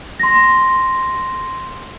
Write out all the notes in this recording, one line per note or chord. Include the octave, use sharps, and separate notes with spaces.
C6 A#6